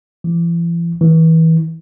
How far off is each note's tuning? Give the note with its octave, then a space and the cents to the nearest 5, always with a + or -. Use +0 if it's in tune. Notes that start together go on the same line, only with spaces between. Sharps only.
E3 +45
E3 -30